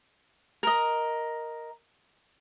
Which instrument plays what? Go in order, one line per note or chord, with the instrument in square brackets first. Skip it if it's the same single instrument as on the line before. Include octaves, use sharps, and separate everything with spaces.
[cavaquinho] A#4 D#5